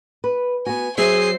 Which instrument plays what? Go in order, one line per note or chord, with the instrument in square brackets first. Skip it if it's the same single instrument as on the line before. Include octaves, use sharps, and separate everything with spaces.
[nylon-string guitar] B4
[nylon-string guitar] B3 F#4 [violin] G#5
[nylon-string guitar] F#3 C4 E5 [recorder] G#4 [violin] C5 C7